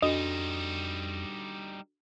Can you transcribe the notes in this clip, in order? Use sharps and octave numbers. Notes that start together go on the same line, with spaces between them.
F2 G3 D4 D#4 F#4 A4 D#5